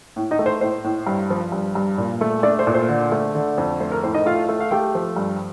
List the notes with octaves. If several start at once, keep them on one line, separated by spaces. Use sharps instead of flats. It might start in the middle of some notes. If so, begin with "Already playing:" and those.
A2
D#4 D#5
A3
C5
A2 C5
A2
G2
F3
G2
G2
A#2
A3
A3 D4 D5
C5
A#2
C5
D3
A3
D3
F2
A3 C5
A#4
A2 C5
D#4 D#5
A3 F4 F5
A3
F5
A3 G4 G5
F3
G2